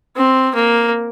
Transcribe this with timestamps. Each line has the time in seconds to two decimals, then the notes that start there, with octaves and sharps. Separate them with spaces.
0.16 C4
0.55 A#3